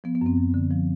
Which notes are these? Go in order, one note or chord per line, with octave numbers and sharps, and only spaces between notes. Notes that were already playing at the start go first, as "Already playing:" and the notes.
F3 B3
B3
F#2 C4
F#2
D3
F3